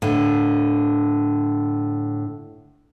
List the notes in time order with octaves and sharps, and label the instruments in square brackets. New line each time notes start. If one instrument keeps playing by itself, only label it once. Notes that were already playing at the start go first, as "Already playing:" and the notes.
[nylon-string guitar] A2 D3